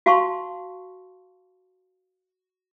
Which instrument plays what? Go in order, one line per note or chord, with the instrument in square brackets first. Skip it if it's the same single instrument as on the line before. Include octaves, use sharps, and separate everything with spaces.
[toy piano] F#4 F5 A5 C6 C#6